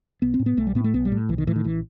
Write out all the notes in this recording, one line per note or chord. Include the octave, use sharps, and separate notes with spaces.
B1 B3
C4
A2
B3
B1 A3
G3
A2 B3
A3
B1 B3
G3
A2
B1 E3
D#3
A2 E3
D#3
A1 E3